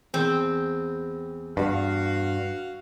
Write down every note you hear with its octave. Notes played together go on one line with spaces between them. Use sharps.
E2 C4
G2 F#4 F5